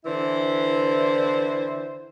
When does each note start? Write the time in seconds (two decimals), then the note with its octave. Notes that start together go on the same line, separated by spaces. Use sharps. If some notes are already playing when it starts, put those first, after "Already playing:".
0.05 D3 E3 E4 C5